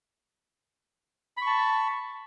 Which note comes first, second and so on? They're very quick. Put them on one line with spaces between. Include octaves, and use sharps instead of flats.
B5 C#6 A5